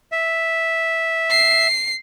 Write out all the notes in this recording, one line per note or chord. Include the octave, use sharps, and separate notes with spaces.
E5
C7